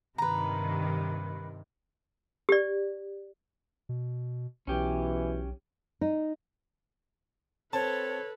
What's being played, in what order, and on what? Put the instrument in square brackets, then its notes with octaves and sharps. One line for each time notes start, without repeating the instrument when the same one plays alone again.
[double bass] G2 C3 [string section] D#3 [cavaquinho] B4 A#5
[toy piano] G4 D5
[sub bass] B2
[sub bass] B1 [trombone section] B2 E3 [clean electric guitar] C#4 G4
[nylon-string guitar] D#4
[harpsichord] C4 [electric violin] A4 B4 [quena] C#5 [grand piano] A5